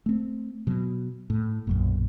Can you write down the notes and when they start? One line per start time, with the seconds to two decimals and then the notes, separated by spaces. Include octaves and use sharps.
0.06 A3 C4
0.67 B2 F#3
1.30 A2
1.67 B1 F#2 A#2